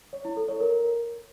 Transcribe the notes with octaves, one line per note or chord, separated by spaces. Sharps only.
C#5
E4
A4
C#5
A#4